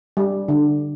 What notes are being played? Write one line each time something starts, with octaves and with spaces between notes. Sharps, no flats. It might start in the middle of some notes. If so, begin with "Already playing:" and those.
G3
D3